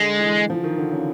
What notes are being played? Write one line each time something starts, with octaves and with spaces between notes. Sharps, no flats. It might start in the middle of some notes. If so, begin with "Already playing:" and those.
Already playing: D3 G#3
E3
F3
D#3
D3
C#3